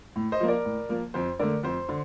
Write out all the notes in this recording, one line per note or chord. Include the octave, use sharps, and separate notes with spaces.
A2
C5 D#5
F3 A#3
A#4 D5
A2
F3 A#3
F2 C5
D3 A3 A#4 D5
F2 C5
D3